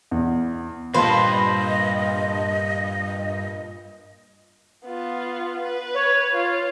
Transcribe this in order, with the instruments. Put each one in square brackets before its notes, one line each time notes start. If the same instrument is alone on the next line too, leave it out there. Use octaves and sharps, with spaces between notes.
[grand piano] E2
[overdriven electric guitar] E2 G2 [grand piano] A#2 A5 [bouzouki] B4 C5 [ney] D#5
[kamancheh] B3 F4
B4
[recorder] C#5
[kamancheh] F4